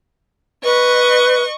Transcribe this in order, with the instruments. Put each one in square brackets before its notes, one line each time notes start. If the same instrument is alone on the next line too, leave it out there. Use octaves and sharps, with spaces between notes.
[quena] B4 [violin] D#5 C#6